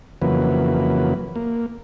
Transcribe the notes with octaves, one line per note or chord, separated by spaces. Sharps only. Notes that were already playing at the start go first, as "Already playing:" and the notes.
F2 C#3 E3 F#3 A#3 B4
A#3